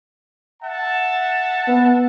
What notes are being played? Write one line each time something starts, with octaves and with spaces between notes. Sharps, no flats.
E5 F#5 A5
B3